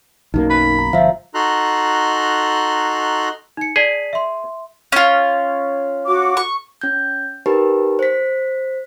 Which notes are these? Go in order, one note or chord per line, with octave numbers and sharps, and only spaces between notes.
B1 F#2 A#3 D#4
B5
A#5
G1 F3 E5 F5
D#4 F#4 A4 A#5 C6 F#6
D#4 C#7
G#4 D5 A5 B6
E5 C6
C#4 F4
F#4 D6
C#6
C#4 G6
D#4 G4 A#4 B4
C5 B6